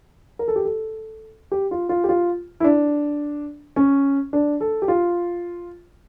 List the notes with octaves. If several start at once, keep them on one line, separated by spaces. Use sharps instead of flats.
A#4
A4
G4
A4
G4
F4
F4
G4
F4
E4
D4
C#4
D4
A4
G4
F4